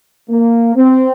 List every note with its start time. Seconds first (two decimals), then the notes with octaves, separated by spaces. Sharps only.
0.29 A#3
0.76 C4